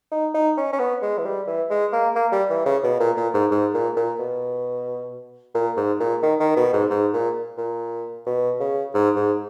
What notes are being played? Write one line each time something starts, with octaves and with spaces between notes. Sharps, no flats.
D#4
D#4
C#4
C#4
B3
G#3
E3
G3
E3
G#3
A#3
A#3
G3
E3
C#3
B2
A#2
A#2
G#2
G#2
A#2
A#2
B2
A#2
G#2
A#2
D#3
D#3
B2
G#2
G#2
A#2
A#2
B2
C#3
G#2
G#2